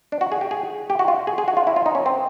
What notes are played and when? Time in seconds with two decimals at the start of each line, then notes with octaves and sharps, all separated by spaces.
0.12 D4
0.21 F#4
0.32 G#4
0.41 G4
0.51 G#4
0.90 G4
0.99 F#4
1.08 F4
1.27 G#4
1.38 G#4
1.48 F#4
1.57 F4
1.67 E4
1.76 F4
1.86 D#4
1.95 C#4
2.06 C4